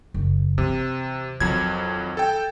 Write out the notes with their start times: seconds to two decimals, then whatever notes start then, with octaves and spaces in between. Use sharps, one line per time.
0.14 F#1
0.58 C3 E3
1.40 F2 D#3 F#3 G#6
2.17 A4 G5